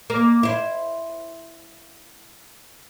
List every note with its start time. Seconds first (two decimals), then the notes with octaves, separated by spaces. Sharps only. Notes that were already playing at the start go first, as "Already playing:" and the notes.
0.10 A#3
0.43 E4 C5